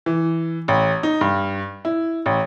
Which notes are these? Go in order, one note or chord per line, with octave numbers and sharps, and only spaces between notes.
E3
A1
D#4
G2
E4
A1